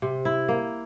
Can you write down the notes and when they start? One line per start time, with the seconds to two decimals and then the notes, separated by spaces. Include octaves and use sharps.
0.02 C3
0.25 E4
0.48 A#3